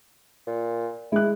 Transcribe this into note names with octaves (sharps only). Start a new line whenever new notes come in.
A#2
G#3 E4 F#6